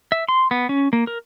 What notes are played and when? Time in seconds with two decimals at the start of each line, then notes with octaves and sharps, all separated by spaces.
0.12 E5
0.29 C6
0.51 B3
0.69 C#4
0.93 A#3
1.07 A#4